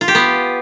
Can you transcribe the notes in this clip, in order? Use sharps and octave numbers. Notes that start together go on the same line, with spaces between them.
F4
G4
B3